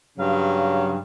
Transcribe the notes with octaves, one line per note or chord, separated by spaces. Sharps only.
G2 C#3 F#3 F5